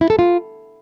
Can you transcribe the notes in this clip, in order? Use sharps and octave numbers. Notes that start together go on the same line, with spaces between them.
E4
A4
F4